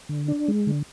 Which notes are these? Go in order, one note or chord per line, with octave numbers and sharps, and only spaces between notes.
D3
D4
G#3
D3